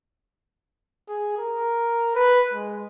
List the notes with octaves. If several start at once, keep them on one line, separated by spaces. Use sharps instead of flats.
G#4
A#4
B4
G#3